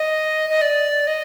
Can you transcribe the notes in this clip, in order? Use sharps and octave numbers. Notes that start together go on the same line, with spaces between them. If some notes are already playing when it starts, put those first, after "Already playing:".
Already playing: D#5
D#5
D5
D#5